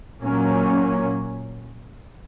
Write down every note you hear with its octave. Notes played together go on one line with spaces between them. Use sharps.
A#2 F#3 A#3 C#4